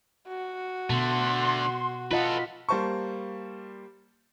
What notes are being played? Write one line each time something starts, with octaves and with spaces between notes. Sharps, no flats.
F#4
B2 D3 A3 C6
F4 A4 B4 D#5 F#5
G3 A#3 C5 A5 C#6